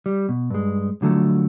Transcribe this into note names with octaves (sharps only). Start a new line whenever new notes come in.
G3
B2
G2 G#3
D3 F3 F#3 A3